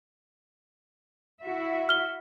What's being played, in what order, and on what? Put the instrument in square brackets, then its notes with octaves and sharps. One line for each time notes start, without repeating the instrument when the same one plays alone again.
[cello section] E4 F#4 E5
[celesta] F6 G7